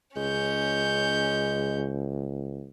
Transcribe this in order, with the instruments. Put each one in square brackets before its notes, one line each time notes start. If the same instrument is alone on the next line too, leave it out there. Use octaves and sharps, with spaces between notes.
[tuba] C#2 [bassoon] G#3 [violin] C#4 G6